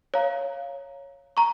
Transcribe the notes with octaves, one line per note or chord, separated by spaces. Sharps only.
C#5 F5 A#5
A#5 C#6